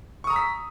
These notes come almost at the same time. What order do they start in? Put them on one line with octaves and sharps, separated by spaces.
C#6 D#6 A#5 E6 B6